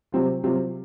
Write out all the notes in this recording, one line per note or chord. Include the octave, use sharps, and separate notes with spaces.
C3 F#3 C4 F4
C3 F#3 C4 F4